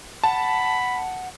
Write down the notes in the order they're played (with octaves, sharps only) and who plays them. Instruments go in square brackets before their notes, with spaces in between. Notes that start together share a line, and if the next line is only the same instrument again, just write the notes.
[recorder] F#5 [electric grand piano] A5 [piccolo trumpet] B5